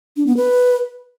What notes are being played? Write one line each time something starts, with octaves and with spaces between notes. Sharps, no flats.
D4
B3
B4